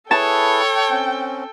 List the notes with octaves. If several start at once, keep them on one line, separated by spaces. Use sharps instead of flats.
E4 G#4 A4 B4 C#5 G5 A5
C4 C#4